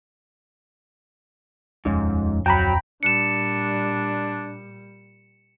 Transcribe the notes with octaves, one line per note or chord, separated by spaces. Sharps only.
D#1 F2 G#2 C#4
D1 F2 F#3 G5 A#5 B5
A#2 G3 D4 C#7 E7